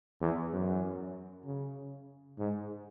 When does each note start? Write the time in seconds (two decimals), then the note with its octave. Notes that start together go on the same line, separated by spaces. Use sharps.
0.21 E2
0.53 F#2
1.46 C#3
2.39 G#2